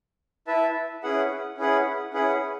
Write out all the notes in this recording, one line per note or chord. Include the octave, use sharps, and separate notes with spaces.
E4 B4 E5 A5
C#4 E4 G#4 B4 F#5
C#4 E4 G#4 B4 F#5
C#4 E4 G#4 B4 F#5